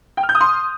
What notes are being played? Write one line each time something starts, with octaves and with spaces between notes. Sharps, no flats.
G5
F6
G6
D#6
C6